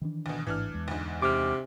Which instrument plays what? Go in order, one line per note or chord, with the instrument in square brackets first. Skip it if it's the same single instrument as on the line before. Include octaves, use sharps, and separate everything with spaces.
[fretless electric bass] D#3 E3 D4
[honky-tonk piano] D2 B2
[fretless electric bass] A1 G#2 [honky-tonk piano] E3 D4 F6
[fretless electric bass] E2 G#3
[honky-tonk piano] D2 G#2
[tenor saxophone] C3 [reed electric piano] D6 F6